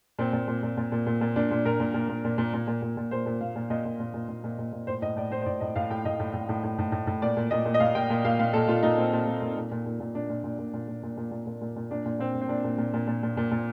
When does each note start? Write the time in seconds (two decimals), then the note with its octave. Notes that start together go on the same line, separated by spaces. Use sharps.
0.19 A#2 C4
0.33 A#2
0.48 A#2
0.63 A#2
0.77 A#2
0.92 A#2
1.06 A#2
1.21 A#2
1.36 A#2 D4
1.51 A#2
1.65 A#2 A#4
1.80 A#2
1.94 A#2
2.09 A#2
2.24 A#2
2.38 A#2
2.54 A#2
2.67 A#2
2.82 A#2
2.97 A#2
3.11 A#2 C5
3.26 A#2
3.41 A#2 F5
3.56 A#2
3.70 A#2 D#5
3.85 A#2
4.00 A#2
4.14 A#2
4.29 A#2
4.44 A#2
4.58 A#2
4.72 A#2
4.87 A2 C5
5.02 A2 D#5
5.17 A2 D5
5.31 A2 C5
5.42 C5
5.46 A2 D5
5.60 A2 D#5
5.76 A2 F5
5.90 A2 G5
6.05 A2 D#5
6.20 A2
6.33 A2
6.49 A2
6.63 A2
6.79 A2
6.92 A2
7.07 A2
7.22 A#2 D5
7.37 A#2
7.51 A#2 D#5
7.65 A#2
7.74 D#5
7.80 A#2 F5
7.95 A#2 G5
8.10 A#2
8.25 A#2 F5
8.39 A#2 F5
8.53 A#2 A4
8.68 A#2 F4
8.83 A#2 D#4
8.97 A#2 C4
9.13 A#2
9.27 A#2
9.42 A#2
9.57 A#2
9.71 A#2
9.86 A#2
10.00 A#2
10.15 A#2 D4
10.30 A#2
10.44 A#2
10.59 A#2
10.74 A#2
10.88 A#2
11.03 A#2
11.17 A#2
11.31 A#2
11.47 A#2
11.61 A#2
11.76 A#2
11.91 A#2 D4
12.05 A#2
12.19 A#2 C4
12.35 A#2
12.41 C4
12.49 A#2 D4
12.64 A#2
12.78 A#2
12.94 A#2
13.07 A#2
13.23 A#2
13.37 A#2
13.51 A#2